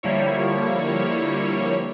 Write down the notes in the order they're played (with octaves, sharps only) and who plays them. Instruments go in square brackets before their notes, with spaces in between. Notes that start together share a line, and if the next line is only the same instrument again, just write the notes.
[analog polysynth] D3 F3 G3 A#3 E4 C#5